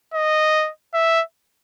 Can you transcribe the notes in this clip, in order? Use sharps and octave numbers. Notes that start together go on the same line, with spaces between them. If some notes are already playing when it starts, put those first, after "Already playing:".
D#5
E5